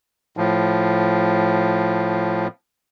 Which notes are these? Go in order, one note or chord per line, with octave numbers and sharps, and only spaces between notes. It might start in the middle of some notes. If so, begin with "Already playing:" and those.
A2 F3